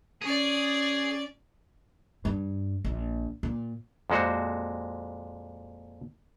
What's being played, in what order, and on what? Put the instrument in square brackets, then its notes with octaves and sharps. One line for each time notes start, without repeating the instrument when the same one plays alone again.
[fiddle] C#4 D5 [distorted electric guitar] G#4
[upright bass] G2
A#1
A#2
[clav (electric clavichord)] F2 A#2 G#3 F#4 C5